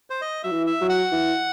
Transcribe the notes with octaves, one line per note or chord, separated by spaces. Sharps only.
C5
D#5
F#3 E5
E3
E5
F#3
F#5
E3